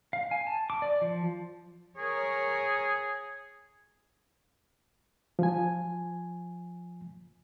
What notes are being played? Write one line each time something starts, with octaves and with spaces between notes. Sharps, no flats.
F5
G#5
A5
D6
D5
F3
G#4 A#4 C#5
F3 G#5